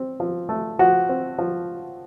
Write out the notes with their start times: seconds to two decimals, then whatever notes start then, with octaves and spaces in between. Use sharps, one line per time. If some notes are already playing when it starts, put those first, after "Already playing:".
Already playing: C4
0.20 F3
0.49 A3
0.79 F3 F#4
1.09 C4
1.38 F3